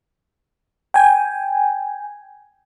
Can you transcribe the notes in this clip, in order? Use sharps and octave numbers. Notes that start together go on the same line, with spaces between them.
G5 G#5